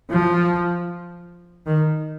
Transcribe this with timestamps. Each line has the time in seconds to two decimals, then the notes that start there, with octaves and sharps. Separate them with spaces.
0.10 F3
1.66 D#3